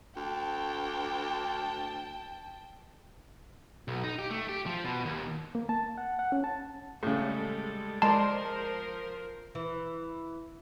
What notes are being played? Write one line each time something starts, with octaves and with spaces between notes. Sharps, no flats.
D2 G5 A5
B1
D#4
G4
A3
G4
F3
B2
D#2
A#3
A5
F#5
F#5
C#4
A5
A2 C#3 G3 G#3 A4
F3 G#3 A#4 C5 D5 A5 C6
E3